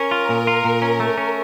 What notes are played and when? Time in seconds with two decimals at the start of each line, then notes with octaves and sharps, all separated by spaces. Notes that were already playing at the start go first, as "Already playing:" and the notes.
Already playing: C#4 A#4
0.11 F4
0.29 A#2
0.47 F4
0.65 A#2
0.82 C#4
1.00 A3
1.18 C#4